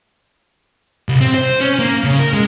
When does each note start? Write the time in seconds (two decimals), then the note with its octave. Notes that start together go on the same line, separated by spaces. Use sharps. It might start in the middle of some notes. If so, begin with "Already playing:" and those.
1.09 C2
1.21 C4
1.34 C5
1.61 C#4
1.79 A#3
2.04 C#3
2.19 A#4
2.33 G#3